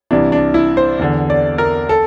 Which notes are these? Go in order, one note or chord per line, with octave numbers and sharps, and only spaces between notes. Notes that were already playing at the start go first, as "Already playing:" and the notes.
C2 C3 E3 D4
D4
E4
C5
E2 D3
D5
A#4
A4